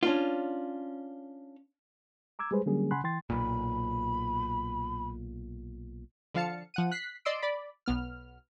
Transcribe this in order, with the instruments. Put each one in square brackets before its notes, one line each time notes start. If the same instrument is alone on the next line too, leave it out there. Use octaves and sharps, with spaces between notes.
[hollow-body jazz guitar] C#4 D4 F4
[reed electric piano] A#5 D6 E6 G#6
G3 G#3 G#4 B4 C5
D3 F#3 G3 A#3 C#4 G#4
C#3 F#5 G#5 B5 C6 F#6
E3 G5 C6 A6
[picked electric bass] B1 A#2 [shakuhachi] B5
[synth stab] D3 F3 F5 A5 C#7
F3 F#5 D#7
F#6 B6 C7
D5 D#5 C6 E6 D7
D5 B5
B1 B3 F6